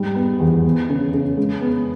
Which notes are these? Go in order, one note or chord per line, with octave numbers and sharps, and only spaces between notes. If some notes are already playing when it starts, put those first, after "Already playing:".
Already playing: G#2 G3
B3
E2
B3
C#3
C#3
G#3
B3